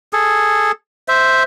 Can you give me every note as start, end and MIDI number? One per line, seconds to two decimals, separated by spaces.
0.13 0.72 68
0.13 0.72 69
1.08 1.43 72
1.08 1.43 76